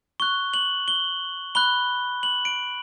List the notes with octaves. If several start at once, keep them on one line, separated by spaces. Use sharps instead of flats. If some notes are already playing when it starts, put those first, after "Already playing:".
C#6 F#6 G7
F#7
G7
B5 F#6 G7
F#7
D7